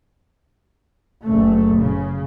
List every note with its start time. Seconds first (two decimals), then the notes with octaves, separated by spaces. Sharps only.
1.24 F#1 A3
1.79 C#3